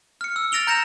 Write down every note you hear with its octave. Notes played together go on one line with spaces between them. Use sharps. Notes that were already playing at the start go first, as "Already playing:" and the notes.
F6 C#7
E6
F6 A6 A#6 D7 F7 G7
A#5 G6 A#6 C#7 E7 F7